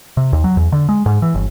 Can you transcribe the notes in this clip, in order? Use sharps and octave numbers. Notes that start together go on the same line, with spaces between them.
C3
D#2
F#3
E2
D3
G#3
G#2
E3
G1